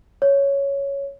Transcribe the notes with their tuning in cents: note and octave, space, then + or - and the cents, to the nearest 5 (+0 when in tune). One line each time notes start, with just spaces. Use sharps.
C#5 +5